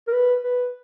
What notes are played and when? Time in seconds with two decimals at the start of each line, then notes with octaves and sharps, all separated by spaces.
0.07 A#4
0.12 B4
0.44 B4